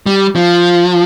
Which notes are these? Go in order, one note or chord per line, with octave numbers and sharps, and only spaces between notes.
G3
F3